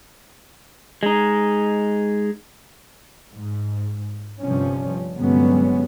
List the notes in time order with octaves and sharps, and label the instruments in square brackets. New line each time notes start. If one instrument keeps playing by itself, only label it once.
[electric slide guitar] G#3 D#4
[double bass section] G#2
G1 G2 C3 F3 C#4
G1 C3 F#3 G#3 B3 C#4